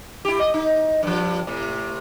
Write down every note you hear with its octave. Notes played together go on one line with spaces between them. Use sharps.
E4 G4
D#5
D#4
G2 F3
A2 C3